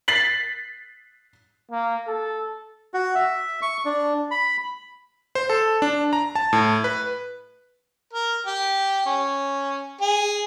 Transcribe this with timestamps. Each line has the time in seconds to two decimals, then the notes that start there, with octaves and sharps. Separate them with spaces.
0.08 A6 B6 C7 F#7
1.71 A#3
2.08 A4
2.94 F#4
3.15 E5
3.62 C#6
3.85 D4
4.31 B5
5.35 C5
5.50 A4
5.82 D4
6.13 A#5
6.35 A5
6.53 A2
6.84 B4
8.13 A#4
8.47 G4
9.06 C#4
10.01 G#4